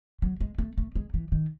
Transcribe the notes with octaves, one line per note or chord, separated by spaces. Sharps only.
F#3
G#3
A3
A3
G#3
E3
D#3